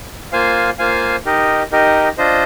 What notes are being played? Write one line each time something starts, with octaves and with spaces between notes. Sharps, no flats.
A#3 F4 C5 F5 G#5
A#3 F4 C5 F5 G#5
D#4 G4 A#4 D#5
D#4 G4 A#4 D#5
D4 F4 C5 D#5